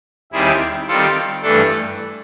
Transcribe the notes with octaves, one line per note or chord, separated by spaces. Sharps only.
D#2 D#3 G3 C4 E4 G#4
D#3 G3 C4 F4 A4
G2 E3 A3 D4 A4